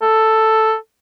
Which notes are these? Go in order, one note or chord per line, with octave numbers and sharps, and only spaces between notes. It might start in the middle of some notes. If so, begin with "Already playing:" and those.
A4